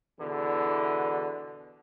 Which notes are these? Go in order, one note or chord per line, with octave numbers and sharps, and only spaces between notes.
E2 B2 D3 E3